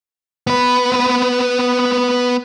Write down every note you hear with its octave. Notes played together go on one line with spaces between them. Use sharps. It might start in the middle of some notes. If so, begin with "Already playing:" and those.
B3 B4